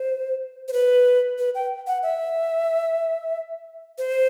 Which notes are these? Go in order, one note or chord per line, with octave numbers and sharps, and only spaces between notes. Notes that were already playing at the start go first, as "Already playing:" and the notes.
Already playing: C5
C5
B4
B4
G5
F#5
E5
C5